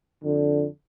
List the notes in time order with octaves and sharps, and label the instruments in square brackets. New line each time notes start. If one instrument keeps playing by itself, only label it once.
[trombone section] F2 D3